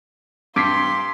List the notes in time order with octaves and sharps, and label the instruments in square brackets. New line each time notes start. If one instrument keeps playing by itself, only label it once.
[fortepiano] G2 [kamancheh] C6 [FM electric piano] D6 B6 C7